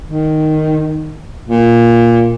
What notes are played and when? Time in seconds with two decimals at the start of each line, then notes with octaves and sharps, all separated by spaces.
0.05 D#3
1.48 A#2